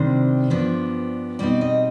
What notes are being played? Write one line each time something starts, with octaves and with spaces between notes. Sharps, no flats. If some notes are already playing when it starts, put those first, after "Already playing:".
Already playing: C3 D#3 G3 D4 C5
G2 F3 B3 D4
B2 G3 C4 D#4 D5
D#5